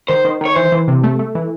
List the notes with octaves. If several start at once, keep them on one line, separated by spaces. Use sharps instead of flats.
D#3 C5
D#3
D#3 C#5
E3 C5
E3
C3
A3
A3
E3